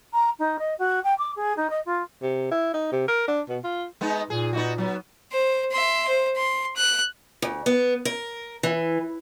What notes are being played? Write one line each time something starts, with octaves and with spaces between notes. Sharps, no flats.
A#5
D#4
D#5
F#4
G5
D6
G#4
D#4
D#5
F4
C3
E4
D#4
C3
A#4
D4
B2
F4
G#3 B3 D#4
A#2 G#4
B3 D#4 F#4
F#3 B3
C5
E5 C6
C5
C6
F#6
D2
B3
A#4
E3